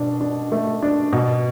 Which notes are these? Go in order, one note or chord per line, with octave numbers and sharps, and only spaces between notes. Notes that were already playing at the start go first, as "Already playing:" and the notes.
Already playing: B2 D4
D4
A3
D4
B2